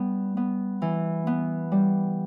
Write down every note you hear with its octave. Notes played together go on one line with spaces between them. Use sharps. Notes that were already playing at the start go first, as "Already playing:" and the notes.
Already playing: G3 B3
B3
E3
B3
G3